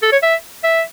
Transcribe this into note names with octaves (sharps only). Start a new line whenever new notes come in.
A4
C#5
E5
E5